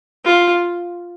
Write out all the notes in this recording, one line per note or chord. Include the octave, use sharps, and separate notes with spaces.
F4